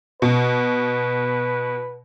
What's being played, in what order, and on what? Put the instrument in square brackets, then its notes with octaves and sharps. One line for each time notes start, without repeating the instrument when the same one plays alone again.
[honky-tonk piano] B2 [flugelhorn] B4